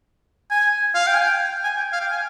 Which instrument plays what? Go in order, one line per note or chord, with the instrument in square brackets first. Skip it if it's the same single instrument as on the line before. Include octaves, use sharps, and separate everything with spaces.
[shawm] G#5
F5
G5
G#5
G5
G#5
G5
F5
G5
G#5